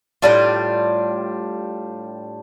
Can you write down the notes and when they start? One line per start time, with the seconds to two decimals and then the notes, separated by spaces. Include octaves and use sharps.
0.22 A2 G3 D4 F4